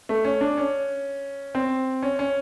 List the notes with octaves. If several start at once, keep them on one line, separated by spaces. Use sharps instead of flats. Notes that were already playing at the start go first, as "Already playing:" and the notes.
A3
C#4
D4
C#4
C4
C#4
C#4